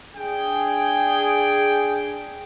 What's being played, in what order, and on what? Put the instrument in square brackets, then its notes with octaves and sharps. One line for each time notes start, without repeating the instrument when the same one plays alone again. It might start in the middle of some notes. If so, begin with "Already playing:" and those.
[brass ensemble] D4 G#4 G5